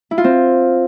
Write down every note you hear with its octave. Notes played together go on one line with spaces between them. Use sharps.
E4
F4
C4